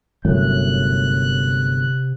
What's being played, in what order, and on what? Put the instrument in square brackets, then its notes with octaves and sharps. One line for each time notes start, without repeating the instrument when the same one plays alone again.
[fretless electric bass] G1 F#2 A2 [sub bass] C3 [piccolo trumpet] F#6